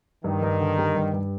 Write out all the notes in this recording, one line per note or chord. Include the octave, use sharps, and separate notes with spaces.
G2 D#3
G2
D3
G3
G2
G2